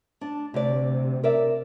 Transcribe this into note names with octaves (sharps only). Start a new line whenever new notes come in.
D4
D2 C3 D5
A#4 D5 E5